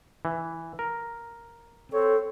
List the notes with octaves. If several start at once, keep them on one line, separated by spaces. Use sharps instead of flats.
E3
A#4
C4 A4 C#5